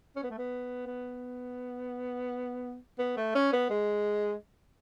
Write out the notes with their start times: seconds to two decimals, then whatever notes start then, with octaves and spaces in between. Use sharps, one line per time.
0.16 C#4
0.23 B3
0.30 A3
0.38 B3
0.86 B3
2.99 B3
3.17 A3
3.35 C#4
3.53 B3
3.70 G#3